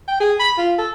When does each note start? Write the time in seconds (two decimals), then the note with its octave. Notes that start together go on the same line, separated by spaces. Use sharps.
0.08 G5
0.20 G#4
0.40 B5
0.58 F4
0.78 A4